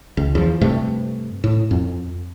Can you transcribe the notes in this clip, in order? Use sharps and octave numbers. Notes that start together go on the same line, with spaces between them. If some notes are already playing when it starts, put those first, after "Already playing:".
C#2
E2 F3
G2 C3 A3
A2
F2